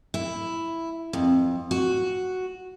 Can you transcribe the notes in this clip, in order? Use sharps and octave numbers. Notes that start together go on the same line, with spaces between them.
E4
F2
F#4